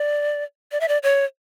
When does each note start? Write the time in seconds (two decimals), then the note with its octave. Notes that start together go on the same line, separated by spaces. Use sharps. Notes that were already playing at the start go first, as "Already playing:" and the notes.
Already playing: D5
0.72 D5
0.80 E5
0.88 D5
1.03 C#5